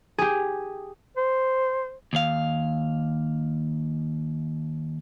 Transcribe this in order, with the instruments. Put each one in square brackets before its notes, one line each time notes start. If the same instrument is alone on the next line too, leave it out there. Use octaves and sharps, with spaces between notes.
[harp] G4 G#4
[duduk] C5
[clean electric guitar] D#2 F5